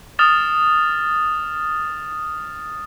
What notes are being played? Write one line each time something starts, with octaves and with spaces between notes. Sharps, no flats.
D#6 F6 A6 E7